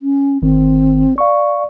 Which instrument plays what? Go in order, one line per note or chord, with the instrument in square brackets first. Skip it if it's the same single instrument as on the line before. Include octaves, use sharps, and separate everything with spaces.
[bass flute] C#4
[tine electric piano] G1 D#3 [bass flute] C4
[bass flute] D5 [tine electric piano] F5 C#6